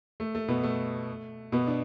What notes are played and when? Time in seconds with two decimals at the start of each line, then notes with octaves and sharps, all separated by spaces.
0.20 A3
0.35 A3
0.48 B2 B3
0.63 A3
1.52 B2 B3
1.67 D4